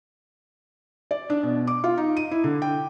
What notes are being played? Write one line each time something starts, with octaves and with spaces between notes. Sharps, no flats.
D5
D4
B2
D6
F4
D#4
D#7
E4
D3
G5